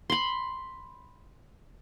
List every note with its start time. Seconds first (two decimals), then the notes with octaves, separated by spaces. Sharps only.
0.10 B5 C6